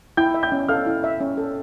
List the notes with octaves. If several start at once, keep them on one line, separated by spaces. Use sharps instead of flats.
E4 G5 G6
E5
G5 G6
C#4
A4 F5 F6
E4
E5
C#4
A4